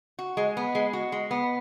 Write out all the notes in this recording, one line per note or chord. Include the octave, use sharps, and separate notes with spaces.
F#4
G#3
B3
G#3
F#4
G#3
B3